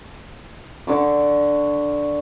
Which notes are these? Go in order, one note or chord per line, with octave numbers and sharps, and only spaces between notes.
D3 C#6 D6